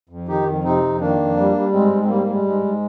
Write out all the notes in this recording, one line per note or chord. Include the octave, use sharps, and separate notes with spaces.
F2
D#3 D#4 G4
F2
C3 C4 D#4
F2
D#3 A#3 D4
F2
G3
G3
G#2 G#3 C4
G#2
C4
G3 A#3
C4
A#3
G3 G#3
G#2 G#3
G#2